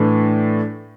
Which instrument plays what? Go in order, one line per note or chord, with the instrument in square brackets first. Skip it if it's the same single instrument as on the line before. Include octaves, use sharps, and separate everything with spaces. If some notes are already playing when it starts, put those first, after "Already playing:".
Already playing: [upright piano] A2 E3 A3 D4